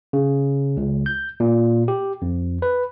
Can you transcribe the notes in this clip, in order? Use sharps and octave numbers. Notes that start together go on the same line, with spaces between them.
C#3
C#2
G6
A#2
G4
F2
B4